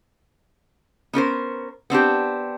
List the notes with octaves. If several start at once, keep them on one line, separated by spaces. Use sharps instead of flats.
B3 C#4 A#4 C5
B3 C4 D4 G4